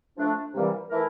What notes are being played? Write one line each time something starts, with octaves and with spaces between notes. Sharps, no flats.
F3 A3 D4
C3 E3 G3 A#3
E3 A3 E4 A#4